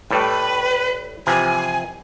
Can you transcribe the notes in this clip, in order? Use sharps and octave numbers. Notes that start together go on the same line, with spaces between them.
A2 G3 A3 B4
C3 E3 F3 G#5